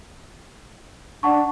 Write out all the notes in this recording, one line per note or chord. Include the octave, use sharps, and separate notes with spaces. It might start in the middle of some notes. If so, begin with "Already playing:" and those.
D4 F#5 A5 C#6